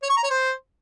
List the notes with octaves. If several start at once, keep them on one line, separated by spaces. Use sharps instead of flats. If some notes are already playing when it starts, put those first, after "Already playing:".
C#5
C#6
A#5
C#5
C5